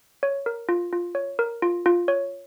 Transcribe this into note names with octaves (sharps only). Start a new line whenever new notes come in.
C#5
A#4
F4
F4
C#5
A#4
F4
F4
C#5